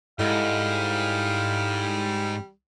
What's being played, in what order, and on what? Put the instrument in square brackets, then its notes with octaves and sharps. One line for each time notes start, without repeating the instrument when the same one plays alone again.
[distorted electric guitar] G#2 [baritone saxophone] G3 [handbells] E4 A4 D#5 [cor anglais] F5